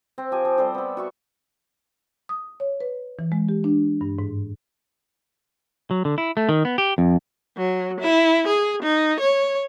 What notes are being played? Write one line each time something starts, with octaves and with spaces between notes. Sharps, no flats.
C4
F3 G4 G#5
F3
G3 C4 A4 C5
B3 B5
F#4 E5 C#6
D#6
C#5
B4
E3
G#3
G4
D4
G2
G#2
F#3
D3
E4
A3
D#3
B3
G4
F2
F#3
E4
G#4
D#4
C#5